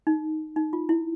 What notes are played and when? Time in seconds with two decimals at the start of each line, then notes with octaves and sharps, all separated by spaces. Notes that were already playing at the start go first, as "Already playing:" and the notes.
0.07 D#4
0.56 D#4
0.73 F4
0.89 E4